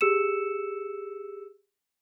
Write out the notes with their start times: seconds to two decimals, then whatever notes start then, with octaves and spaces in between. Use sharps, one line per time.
0.01 G4 G#4 E6 C#7 E7